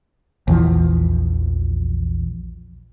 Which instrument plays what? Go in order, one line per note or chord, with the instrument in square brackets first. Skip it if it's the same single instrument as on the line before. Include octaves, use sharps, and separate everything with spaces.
[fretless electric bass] A#1 E2 E3 F3